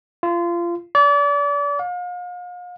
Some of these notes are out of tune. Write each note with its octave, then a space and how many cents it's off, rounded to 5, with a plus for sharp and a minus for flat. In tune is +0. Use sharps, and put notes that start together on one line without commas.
F4 -25
D5 -35
F5 +40